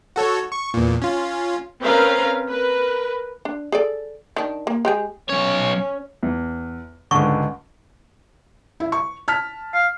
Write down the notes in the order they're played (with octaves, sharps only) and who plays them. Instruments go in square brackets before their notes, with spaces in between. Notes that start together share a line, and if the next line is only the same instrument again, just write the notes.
[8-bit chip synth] F#4 A4 C#5
C#6
E2 A#2
C#4 F4
[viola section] C4 C#4 A#4 B4 F5 A#5
A#4 B4
[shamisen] D4
G#4 A4 D5
D#3 D4
A#3
G#3 G4 G#4
[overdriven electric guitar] B1 C#5 [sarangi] C#4
[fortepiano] E2
[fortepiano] C#2 G#2 D3 [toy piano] C#6
[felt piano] E4
C#6
A5 F6 B6
[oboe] F5